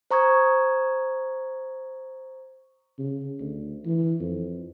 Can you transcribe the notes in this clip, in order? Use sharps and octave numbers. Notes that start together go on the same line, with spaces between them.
C5 A#5 C#6 D#6 G#6
C#3
D2
E3
F2